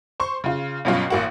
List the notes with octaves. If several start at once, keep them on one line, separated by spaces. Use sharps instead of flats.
C5 C6 C#6
C#3 F4
G2 B2 F#3 C#4 F4
A1 A#3 F#4